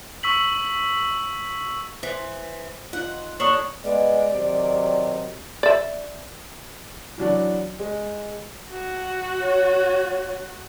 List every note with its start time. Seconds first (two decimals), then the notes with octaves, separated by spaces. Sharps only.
0.23 C#6 E6 B6 F#7
2.03 E3 C5
2.93 D#4 F4 F#5
3.40 A#3 D4 A4 A#4 C#5 C#6 D#6 F#7
3.84 G#3 B3 D5
4.32 C3 D#3 F#3
5.63 D5 E5
7.18 E3 F#3 D4
7.80 G#3
8.71 F#4
9.41 C#5